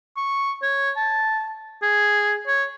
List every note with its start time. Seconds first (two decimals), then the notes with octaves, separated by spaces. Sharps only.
0.17 C#6
0.62 C#5
0.97 A5
1.82 G#4
2.47 C#5